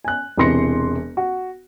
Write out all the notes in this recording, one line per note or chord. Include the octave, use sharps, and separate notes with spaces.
G#5 F#6
E1 C3 E3 C6 A#6 C#7
F#4